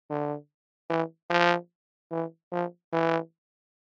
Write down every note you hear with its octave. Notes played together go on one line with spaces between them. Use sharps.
D3
E3
F3
E3
F3
E3